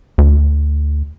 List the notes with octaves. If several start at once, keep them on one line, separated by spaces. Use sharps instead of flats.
D2